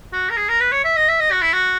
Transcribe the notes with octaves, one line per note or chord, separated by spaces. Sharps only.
F#4
A#4
G#4
A#4
B4
C#5
E5
D#5
E5
D#5
F#4
E4
F#4